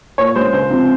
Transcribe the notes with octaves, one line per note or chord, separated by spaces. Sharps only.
A#2 C#5
G#3 C#4 C5
C#2 C5
C3 F3 C4